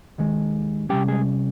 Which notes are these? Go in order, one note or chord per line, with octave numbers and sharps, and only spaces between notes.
D#2 D#3 G#3
C3 G3 C#4 G4 G5
G#3 G#4